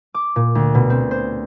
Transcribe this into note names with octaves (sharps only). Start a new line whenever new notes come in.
D6
A#2
D2
B2
C4
C5